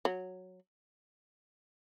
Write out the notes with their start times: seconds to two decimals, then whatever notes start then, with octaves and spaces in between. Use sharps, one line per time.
0.05 F#3